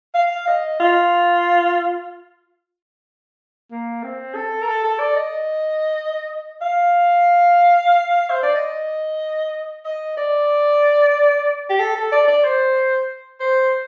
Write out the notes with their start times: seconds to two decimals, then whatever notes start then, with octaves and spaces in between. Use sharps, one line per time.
0.14 F5
0.47 D#5
0.80 F4
3.71 A#3
4.03 C4
4.34 A4
4.62 A#4
4.67 A4
4.84 A4
4.99 D5
5.15 D#5
6.61 F5
8.30 C5
8.43 D5
8.55 D#5
9.85 D#5
10.17 D5
11.69 G4
11.79 A4
11.95 A4
12.12 D5
12.27 D5
12.44 C5
13.40 C5